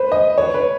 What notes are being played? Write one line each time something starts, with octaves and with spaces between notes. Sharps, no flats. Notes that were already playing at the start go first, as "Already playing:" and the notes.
Already playing: B4 C5
D#5
C#5
B4